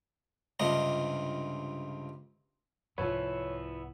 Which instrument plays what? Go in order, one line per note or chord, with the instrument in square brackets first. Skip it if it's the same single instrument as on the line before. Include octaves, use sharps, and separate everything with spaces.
[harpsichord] C#2 G2 C3 D4 F4 D#5
[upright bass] C2 G#2 [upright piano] F3 B4 [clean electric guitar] B3 E4 [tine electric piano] C#5